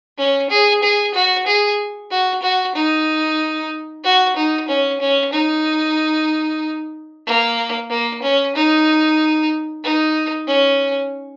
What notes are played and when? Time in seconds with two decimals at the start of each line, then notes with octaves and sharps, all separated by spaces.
0.18 C#4
0.50 G#4
0.83 G#4
1.14 F#4
1.47 G#4
2.11 F#4
2.43 F#4
2.75 D#4
4.04 F#4
4.36 D#4
4.69 C#4
5.01 C#4
5.33 D#4
7.27 A#3
7.90 A#3
8.23 C#4
8.55 D#4
9.84 D#4
10.48 C#4